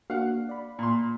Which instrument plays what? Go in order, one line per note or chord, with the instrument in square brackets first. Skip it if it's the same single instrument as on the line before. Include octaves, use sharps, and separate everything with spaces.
[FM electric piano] A#3 D4 F#4 [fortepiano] F5 F#5
[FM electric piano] D5 B5
[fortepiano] A#2 C6